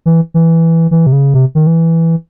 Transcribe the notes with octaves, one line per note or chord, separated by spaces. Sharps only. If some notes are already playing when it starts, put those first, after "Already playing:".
E3
E3
E3
C3
C#3
C3
D#3
E3